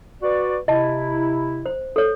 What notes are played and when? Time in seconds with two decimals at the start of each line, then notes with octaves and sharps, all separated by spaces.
0.22 F#4 B4 D5
0.68 C3 E4 D#5 A5
1.66 C5
1.96 A4 C#5